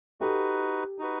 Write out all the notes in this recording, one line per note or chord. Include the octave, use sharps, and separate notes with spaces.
D#4 F#4 G4 A4 B4
D#4 F#4 B4